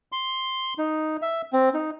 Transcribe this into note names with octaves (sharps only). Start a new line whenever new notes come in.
C6
D#4
E5
C4
D#4